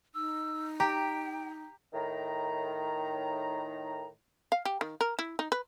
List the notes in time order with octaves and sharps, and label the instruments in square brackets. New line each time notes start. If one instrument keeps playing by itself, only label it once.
[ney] D#4 [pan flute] E6
[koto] G4 [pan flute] G5 [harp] A#5
[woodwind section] A2 D#3 A#5
[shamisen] F5
G4
D#3
A#4
E4
D#4
B4